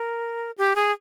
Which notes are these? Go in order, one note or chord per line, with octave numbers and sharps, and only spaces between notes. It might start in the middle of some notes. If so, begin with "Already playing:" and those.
Already playing: A#4
G4
G#4